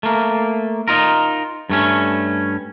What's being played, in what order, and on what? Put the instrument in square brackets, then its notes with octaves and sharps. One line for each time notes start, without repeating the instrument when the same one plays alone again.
[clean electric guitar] A3 A#3
D#4 F4 A#4
G2 A3 C#4